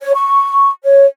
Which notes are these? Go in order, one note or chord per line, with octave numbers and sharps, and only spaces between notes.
C#5
C#6
C#5